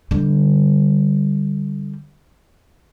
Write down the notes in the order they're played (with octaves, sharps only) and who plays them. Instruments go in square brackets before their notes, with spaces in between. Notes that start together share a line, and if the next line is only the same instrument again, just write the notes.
[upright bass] D3 G3